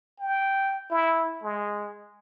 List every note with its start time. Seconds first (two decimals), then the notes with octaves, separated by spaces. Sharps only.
0.20 G5
0.90 E4
1.43 G#3